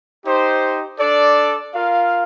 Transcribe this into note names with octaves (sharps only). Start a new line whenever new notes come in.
D#4 G4 C5
D4 A4 D5
F4 A#4 F5